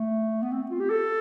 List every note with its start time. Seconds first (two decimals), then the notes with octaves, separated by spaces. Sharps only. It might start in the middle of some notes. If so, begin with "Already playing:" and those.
Already playing: A3
0.42 B3
0.52 C4
0.71 F4
0.80 G4
0.90 A4